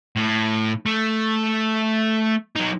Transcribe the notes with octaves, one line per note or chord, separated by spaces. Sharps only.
A2
A3
F#3 D#4